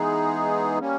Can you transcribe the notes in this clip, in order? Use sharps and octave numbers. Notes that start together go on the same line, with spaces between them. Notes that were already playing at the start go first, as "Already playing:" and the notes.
Already playing: E3 G#3 B3 D#4 G#4
G3 A#3 C#4